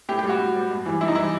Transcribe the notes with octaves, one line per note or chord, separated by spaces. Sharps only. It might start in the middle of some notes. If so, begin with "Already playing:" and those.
A2 G4
G4
G3
F#4
A2
G3
G2
E3 G3
G2 E4
D#4
E3 G3 E4